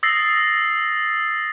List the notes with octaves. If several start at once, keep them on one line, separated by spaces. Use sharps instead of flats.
D#6 E6 A6 A#6 C7